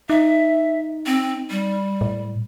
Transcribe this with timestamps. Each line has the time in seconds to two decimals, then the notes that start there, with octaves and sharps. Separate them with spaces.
0.10 D#4 E5
1.07 C4
1.50 G3
2.01 A2